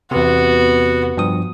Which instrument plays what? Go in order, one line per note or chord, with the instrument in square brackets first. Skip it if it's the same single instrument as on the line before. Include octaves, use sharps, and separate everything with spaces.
[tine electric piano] E2 C3 [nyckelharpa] B3 F#4
[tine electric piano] G2 F3 D#6